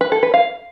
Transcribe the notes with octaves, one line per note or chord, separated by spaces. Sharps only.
B4
A4
B4
F5